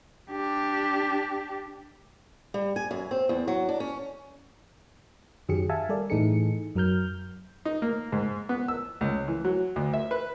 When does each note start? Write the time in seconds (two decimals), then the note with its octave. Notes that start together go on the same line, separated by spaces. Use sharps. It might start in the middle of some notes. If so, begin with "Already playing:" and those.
0.31 D4 G4
2.54 G3
2.76 G#5
2.91 F#2
3.11 C4
3.29 E2
3.48 F#3
3.69 D4
3.80 C#4
5.49 F#2 D#3 F#3 G4 G#4 C#7
5.69 E5 F5 G#5 A5
5.89 G3 A4 A#4 D5
6.10 A2 E3 D#4 G#4 A4 C#7
6.75 F#2 F#3 A#4 F6 G6
7.65 D#4
7.82 A#3
8.12 G#2
8.49 B3
8.68 E6
9.01 C#2
9.28 E3
9.45 F#3
9.76 D2
9.94 E5
10.11 B4